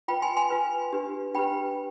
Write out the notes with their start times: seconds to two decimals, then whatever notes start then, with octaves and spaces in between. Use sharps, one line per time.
0.08 F4 B4 G5 B5
0.22 G#5 C6
0.37 G#5 C6
0.50 F4 B4
0.92 D4 G4 B4
1.34 D4 G4 B4 G5 B5